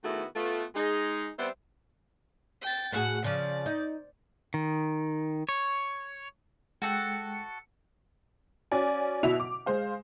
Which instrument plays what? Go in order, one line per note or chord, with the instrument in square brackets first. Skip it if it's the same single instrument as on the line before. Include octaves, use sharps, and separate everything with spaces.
[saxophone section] D#3 A3 B3 E4 F#4 G#4
A3 B3 F4
G#3 D#4 G#4
G3 B3 C4 C5 E5
[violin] G5 A6
[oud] A2 F#4 G#4 [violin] F#5
[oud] C#3 F3 [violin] D5
[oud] D#4
[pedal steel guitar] D#3
C#5
[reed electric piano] G#3 G5 [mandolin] F#4 A4 F#5
[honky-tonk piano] C#4 F#4 D5 G#5
B2 E4 F#4 E5 F7
D6
G#3 C5 F5